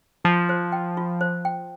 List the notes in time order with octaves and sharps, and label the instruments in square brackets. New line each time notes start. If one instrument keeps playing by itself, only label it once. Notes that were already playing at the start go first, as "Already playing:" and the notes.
[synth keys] F3 [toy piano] F4
[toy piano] C5
G5
F4
C5
G5